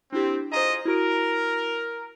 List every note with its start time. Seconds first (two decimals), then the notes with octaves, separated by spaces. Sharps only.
0.13 C4 D4 E4 G4
0.52 F4 G#4 C5 D#5 A#5
0.85 E4 F#4 A#4 D7